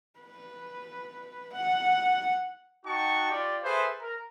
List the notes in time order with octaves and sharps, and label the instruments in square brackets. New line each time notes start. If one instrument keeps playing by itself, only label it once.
[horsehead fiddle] B4
F#5
[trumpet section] D#4 F#4 G5 A5 C#6
F4 G4 D5
G#4 A4 B4 C5 E5
A#4